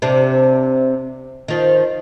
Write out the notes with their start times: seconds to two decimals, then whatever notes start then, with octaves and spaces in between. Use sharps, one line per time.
0.02 C3 D4
1.48 D#3 F3